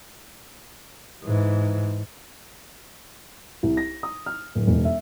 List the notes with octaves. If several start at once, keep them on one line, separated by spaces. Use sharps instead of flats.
G#2 E3
C2
A#6
D#6
F6
D1
E1
E5